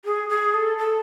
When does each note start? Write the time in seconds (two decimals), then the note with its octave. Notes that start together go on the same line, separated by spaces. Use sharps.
0.05 G#4
0.29 G#4
0.54 A4
0.78 A4